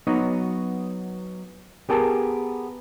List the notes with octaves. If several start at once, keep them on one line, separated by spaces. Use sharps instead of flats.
F#3 B3 D#4 F#4
B3 G4 G#4 A#4 A5